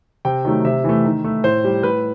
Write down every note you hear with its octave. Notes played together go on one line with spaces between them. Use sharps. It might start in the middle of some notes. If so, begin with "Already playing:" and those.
C3 G5
D#3 F#3 A3
C3 E5
E3 A3
D#3
A3
A2 C5
G3
A2 B4